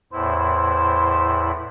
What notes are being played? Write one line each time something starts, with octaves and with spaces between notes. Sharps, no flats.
E2 A2 E4 C5